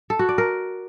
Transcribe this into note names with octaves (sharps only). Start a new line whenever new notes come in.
A4
F#4
D5
A#4